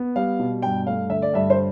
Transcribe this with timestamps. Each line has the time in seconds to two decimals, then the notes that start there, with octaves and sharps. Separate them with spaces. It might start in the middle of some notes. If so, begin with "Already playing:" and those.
Already playing: B3
0.16 G3 F5
0.39 B2
0.62 G2 G5
0.87 A3 F5
1.10 D3 E5
1.22 D5
1.34 G2 E5
1.50 C5